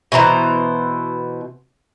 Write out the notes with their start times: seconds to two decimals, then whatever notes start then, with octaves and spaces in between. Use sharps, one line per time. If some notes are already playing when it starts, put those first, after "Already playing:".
0.12 B2 E3 C5 A#5